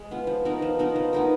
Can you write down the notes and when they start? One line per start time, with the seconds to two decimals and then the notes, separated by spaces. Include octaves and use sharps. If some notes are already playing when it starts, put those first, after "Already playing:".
Already playing: G#3
0.11 B3 F4
0.27 F3
0.45 B3 D#4 A#4
0.62 F3
0.79 B3 D#4 A#4
0.96 F3
1.13 B3 D#4 A#4